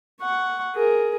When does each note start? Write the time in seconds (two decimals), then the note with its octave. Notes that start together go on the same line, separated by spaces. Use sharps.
0.21 F#5 C#6
0.76 G#4 A#4